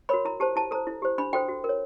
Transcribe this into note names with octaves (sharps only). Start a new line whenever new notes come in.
F#4 A#4 C#5 B5
E4 A#5
G4 C5 A5
E4 A5
A4 C5 A#5
E4
G4 C5
D4 B5
F#4 A4 C5 G5
F#4
A#4
C#5